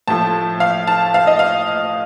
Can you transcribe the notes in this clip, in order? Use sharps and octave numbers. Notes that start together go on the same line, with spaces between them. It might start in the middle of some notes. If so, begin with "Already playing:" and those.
A2 F3 A3 A5
F5
A5
F5
D#5
F5